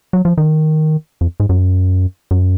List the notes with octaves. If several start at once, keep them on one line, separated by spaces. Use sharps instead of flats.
F#3
F3
D#3
F2
G#2
F#2
F#2